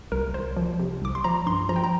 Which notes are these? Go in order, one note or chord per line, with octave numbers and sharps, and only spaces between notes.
C2 A#4
C2 C5
F3
C3
C2 D6
C6
F3 A#5
G2 C6
F3 A#5
G5
A#5